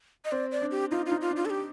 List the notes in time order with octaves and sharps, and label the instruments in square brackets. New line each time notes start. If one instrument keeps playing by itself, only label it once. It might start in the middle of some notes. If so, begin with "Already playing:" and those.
[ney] D#5
[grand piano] C4 [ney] D5
[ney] D5
[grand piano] D4
[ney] G4
[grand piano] D#4 [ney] F4
[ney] F4
[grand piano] D#4
[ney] F4
[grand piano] D4
[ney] F4
A4
G4